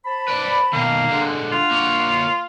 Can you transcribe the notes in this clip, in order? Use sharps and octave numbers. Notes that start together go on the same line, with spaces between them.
C5 A5 B5
B4 D5
B2 D#3 A#3
D3 G#3 D4 F#5
F4
A#3 C#5